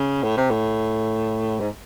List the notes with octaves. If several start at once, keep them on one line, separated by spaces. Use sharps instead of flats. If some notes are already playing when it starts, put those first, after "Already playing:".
Already playing: C#3
A2
C3
A2
G#2